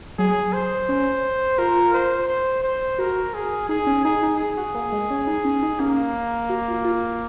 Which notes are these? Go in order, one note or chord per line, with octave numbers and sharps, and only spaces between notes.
F#3 G#4
C5
C#4
F4 A#4
C5
C5
C5
F#4 A#4
G#4
D#4 G#4
C#4
D#4 G#4
D#4
G#4
F#4
A#3
G#3
C#4
D#4
C#4
D#4
A#3 C#4
F#4
F4
F4